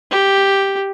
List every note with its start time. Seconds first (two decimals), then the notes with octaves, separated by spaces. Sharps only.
0.11 G4